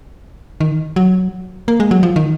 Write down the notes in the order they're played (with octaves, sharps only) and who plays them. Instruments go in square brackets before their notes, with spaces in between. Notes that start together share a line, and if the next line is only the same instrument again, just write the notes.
[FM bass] D#3
F#3
A#3
G#3
F#3
F3
D#3